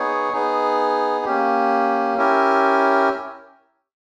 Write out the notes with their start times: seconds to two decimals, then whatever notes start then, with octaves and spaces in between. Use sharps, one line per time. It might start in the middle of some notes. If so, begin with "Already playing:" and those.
Already playing: B3 D#4 G#4 C#5
0.33 B3 D#4 G#4
1.25 A#3 C#4 G4
2.17 C#4 E4 G4 A#4